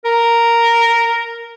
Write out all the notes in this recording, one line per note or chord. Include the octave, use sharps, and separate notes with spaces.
A#4